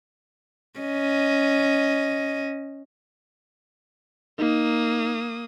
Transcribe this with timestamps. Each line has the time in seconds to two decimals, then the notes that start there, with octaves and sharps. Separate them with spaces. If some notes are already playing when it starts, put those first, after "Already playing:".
0.79 C#4 D#5
4.39 A#3 D#4 D#6